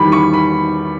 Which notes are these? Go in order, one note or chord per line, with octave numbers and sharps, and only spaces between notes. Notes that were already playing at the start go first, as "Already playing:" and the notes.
Already playing: E2 D#3 G3 B5
C#6
B5